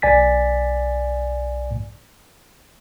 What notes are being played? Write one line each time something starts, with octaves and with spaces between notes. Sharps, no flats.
B1 D5 G#5 A6 B6